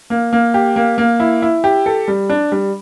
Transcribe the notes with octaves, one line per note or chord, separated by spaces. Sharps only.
A#3
A#3
G4
A#3
A#3
E4
E4
G4
A4
G3
D4
G3